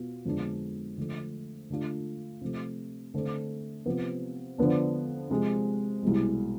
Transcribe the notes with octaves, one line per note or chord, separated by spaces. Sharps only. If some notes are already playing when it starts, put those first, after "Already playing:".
Already playing: B2 B3 F4
F2 D3 G#3 B3 D4
D3 F3 A3
D3 A3 D4 F4
C3 F3 A3
D3 A3 C4
C3 F3 B3
D3 F3 B3 D4
C3 F3 G#3
C2 B2 G#3